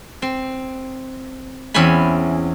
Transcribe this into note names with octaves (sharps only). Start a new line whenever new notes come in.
C4
E2 C4 C#4 G#5 B5